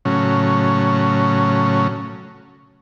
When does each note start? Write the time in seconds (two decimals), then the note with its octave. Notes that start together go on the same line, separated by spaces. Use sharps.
0.05 A2 C#3 F#3 C#4